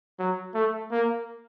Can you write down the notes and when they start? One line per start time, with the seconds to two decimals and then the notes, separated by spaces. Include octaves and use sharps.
0.19 F#3
0.55 A3
0.92 A#3